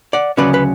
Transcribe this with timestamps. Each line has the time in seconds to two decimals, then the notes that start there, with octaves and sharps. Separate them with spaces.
0.13 D5 F#5
0.38 D2 C#3 F#3 C#4 B4 D5
0.54 B4